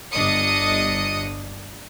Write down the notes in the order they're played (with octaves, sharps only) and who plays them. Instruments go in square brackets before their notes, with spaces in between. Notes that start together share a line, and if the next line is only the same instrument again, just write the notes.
[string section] G1 D4 D#5 D#6 C#7